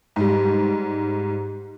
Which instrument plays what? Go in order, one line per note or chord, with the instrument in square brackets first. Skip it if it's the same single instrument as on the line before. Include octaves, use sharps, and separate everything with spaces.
[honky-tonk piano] G#2 G3